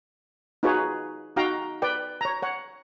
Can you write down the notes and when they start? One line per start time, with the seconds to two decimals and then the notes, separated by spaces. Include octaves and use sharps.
0.63 D#4 F4 F#4 G#4 B4 C#5
1.36 D#4 F#4 F5 G5 A#5
1.82 B4 D5 G5
2.21 C#5 A#5
2.42 C#5 F#5